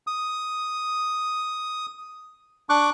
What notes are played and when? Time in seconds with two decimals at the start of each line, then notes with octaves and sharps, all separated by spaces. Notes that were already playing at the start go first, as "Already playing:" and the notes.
0.07 D#6
2.70 D4 C#6 D6 F#6